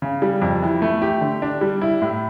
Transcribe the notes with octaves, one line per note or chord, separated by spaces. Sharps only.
C#3
G3
F2
E3
A3
G4
D3
D4
G3
E4
A2